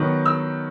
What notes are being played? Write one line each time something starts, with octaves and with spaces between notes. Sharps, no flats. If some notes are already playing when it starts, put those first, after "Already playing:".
Already playing: D#3 F#3 B3
E6